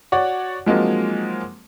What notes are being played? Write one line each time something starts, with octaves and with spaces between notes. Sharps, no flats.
F#4 C#5 D5 F#5
F3 F#3 G#3 A#3 C4 D#4